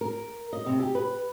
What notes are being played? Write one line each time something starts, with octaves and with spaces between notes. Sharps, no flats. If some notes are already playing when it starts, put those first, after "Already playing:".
A#4
D#5
C3
G4
B4